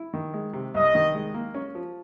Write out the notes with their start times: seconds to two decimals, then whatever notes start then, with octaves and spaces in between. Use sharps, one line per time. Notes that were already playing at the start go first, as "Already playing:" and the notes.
Already playing: E4
0.14 D#3
0.34 G#3
0.53 C3
0.74 C2 D#5
0.95 D#3
1.15 G#3
1.34 A#3
1.54 C#4
1.75 F3